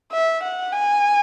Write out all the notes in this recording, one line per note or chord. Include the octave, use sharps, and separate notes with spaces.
E5
F#5
G#5